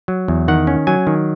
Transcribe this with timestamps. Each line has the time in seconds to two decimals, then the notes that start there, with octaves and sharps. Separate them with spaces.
0.08 F#3
0.28 E2
0.48 D#3 F#5
0.67 C#4
0.87 F#3 G#5
1.07 D#3